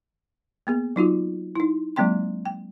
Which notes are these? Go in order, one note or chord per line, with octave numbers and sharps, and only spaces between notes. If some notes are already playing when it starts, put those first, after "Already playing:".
A#3 B3 G#4
F#3 D#4 F4 F#4
D#4 E4
F#3 G#3 A#3 C4 G5 C6
G5